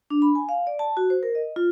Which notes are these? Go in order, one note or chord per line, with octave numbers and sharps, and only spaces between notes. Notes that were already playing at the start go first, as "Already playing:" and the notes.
D4
B5
G#5
F5
D5
A5
F#4
C5
A#4
D#5
F4